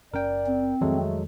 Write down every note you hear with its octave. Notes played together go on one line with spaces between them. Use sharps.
F#1 C#4 A#4 D5 G5
C4
F2 D#3 F3 F#3 G#3 A3 A4